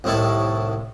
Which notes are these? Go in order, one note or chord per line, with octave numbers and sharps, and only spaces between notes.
C2 A2 D#3 E4 C#5 A5